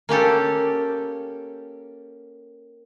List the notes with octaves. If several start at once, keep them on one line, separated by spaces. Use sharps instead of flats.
A#3 C#4 G4 A4